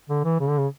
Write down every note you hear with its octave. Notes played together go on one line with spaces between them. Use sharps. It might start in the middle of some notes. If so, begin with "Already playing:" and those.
D3
E3
C#3
D3
C#3